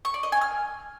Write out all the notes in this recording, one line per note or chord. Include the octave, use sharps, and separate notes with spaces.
C#6
D5
D#5
G#5
F6